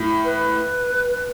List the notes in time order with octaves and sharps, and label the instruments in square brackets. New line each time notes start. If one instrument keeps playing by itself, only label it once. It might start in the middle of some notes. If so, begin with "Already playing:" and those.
Already playing: [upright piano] A2
[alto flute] B4